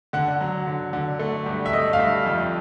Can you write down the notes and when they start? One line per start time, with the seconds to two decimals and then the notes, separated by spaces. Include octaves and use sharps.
0.13 D3 F#5
0.41 F#3
0.67 D3
0.93 D3
1.19 A3
1.46 G2
1.66 E5
1.73 A3 D#5
1.93 F5
1.99 G2 E5
2.26 F2